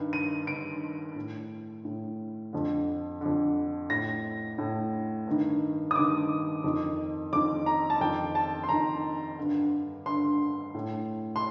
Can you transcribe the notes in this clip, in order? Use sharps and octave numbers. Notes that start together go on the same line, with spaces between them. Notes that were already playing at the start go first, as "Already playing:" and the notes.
Already playing: G2 D#3
D#7
G2 D#3 D7
A2
A2
F2 D3
F2 D3
A2 A#6
A2
G2 D#3
D#6
G2 D#3 D6
F2 D#3
F2 D#3 D6
A#5
A5
F2 D#3 G5
A5
C6
F2 D#3 A#5
G2 D3
G2 D3 C6
A2
C6